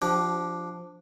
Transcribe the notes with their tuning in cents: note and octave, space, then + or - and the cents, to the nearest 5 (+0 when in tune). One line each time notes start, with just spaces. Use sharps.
F3 +0 D4 +0 G4 -30